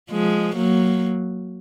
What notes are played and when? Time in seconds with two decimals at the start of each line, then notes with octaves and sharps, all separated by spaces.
0.11 F3 G#3
0.56 F#3 A#3